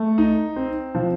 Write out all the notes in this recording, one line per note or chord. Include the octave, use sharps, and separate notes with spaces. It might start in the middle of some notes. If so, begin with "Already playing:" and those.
Already playing: A3
D#4
C4
F3